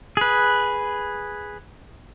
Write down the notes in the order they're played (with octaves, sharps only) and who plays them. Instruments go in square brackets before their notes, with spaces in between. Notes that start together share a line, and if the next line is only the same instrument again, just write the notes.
[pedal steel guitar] G#4 B4